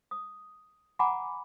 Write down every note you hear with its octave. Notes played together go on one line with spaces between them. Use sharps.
D#6
F#5 G#5 A#5 B5 D6